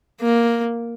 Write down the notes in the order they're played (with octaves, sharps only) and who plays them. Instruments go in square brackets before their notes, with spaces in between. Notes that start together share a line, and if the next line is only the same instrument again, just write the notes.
[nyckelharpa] A#3